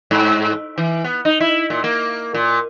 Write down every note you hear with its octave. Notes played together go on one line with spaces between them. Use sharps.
G#2
E3
B3
D#4
E4
A#2
A#3
A#2